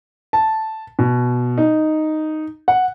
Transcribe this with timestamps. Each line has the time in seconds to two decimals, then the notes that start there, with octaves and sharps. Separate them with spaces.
0.33 A5
0.99 B2
1.58 D#4
2.68 F#5